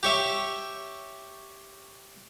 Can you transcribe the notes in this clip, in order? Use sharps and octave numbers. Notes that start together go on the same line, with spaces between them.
G4 C#5 E5